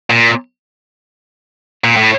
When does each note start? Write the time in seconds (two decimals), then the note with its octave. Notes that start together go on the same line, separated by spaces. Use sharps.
0.10 A#2
1.84 A#2
1.97 A2